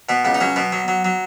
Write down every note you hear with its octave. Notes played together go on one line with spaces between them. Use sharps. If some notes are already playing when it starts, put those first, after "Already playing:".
B2 B3
C#2 B3
D#4
F#3 C#4
B2 B3
F#3
F#3
F#3